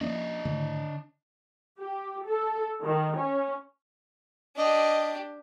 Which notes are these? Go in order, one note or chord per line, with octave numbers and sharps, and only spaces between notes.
F3 A#3 C#4 D4 D5 D#5
G#2 D3 D#3 A3
G4
A4
D#3
C#4
D4 G4 D#5